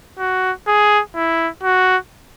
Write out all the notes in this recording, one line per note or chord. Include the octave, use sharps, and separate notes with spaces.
F#4
G#4
E4
F#4